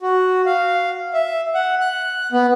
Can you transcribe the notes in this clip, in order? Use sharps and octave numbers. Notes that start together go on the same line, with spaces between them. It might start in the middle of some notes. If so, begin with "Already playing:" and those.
F#4
F5
E5
F#5
F#6
B3